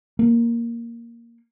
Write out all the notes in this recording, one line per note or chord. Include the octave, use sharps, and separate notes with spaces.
A#3